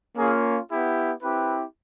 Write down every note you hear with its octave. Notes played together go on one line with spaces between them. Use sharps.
A#3 C#4 F4 G#4
B3 E4 G4
C4 E4 G4 B4